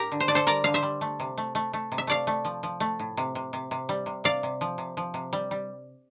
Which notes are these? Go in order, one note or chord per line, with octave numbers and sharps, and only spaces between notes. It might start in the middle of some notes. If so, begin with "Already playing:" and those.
Already playing: A2 G4 A#4
D3
C5
D3 D5
A4 C5
G3 A#4 D5
D3 F5
C5 E5
G3
A3
C3
A3
A3
A3
C3
E5
A3 D5 F5
A3
F3
F3
A3
A2
C3
C3
C3
C3
G3
C3
C3 D5 F5
C3
F3
C3
F3
C3
G3
G3